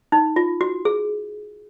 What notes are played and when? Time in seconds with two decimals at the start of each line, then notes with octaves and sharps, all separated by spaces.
0.12 D#4
0.36 F4
0.61 F#4
0.85 G#4